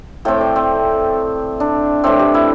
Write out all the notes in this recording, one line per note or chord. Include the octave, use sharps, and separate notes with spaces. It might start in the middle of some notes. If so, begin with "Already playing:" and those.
A2 A3 C4 G5
D5
C4
D4
A2 E3 C4 D4
G4
E4